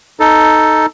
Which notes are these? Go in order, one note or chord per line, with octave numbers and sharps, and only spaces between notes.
D#4 A4